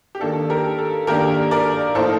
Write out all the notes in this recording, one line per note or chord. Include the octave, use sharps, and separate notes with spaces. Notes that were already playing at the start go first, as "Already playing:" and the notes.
G4
D#3 A#3 D4 A4
G4 A#4
A4
D#3 A#3 D4 G4 A#4
A#4 D5
A2 F3 A#3 D#4 A4 C5